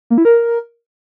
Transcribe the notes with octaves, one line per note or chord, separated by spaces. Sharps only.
A#3
E4
A#4